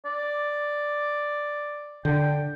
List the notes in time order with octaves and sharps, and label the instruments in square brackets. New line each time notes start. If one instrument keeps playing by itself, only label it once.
[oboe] D5
[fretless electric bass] D3 [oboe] G5